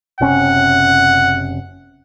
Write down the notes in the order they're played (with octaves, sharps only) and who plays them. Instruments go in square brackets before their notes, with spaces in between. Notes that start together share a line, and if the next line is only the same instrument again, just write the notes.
[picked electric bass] F#1 C3 C#4 [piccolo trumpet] F#5